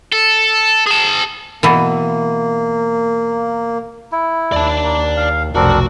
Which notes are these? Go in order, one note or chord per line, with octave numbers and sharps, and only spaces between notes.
A4
G#4 A5
B2 E3 A#3
E4
D#2 D5 A5
A#3
F5
F1 B1 C4 D4 F#4 A#4